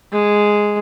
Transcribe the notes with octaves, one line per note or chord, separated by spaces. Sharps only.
G#3